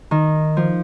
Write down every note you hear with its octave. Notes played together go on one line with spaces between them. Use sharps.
D#3
F3